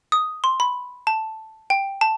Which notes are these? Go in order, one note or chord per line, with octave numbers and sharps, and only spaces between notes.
D#6
C6
B5
A5
G5
A5